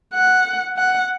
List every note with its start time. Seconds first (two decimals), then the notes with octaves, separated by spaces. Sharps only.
0.14 F#5
0.77 F#5